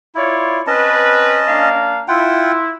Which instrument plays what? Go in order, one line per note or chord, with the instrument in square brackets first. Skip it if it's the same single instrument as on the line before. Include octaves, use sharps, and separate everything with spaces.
[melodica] E4 [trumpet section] F4 C#5 D5
[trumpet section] C4 B4 [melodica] C#4 D#5 A5
[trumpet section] A#3 D4 F5
[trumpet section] E4 [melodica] F4 F#5 G5